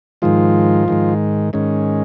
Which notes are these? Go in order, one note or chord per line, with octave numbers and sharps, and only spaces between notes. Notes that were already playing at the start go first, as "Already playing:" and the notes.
G#2 D#3 F3 G#3 F4
G#2 D#3 G#3
G#2 D#3 G#3 C#4